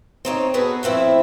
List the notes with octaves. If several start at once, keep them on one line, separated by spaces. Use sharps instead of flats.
C4 D#4 C#5
B3 F#4 G#4 A4
A2 F3 C4 E4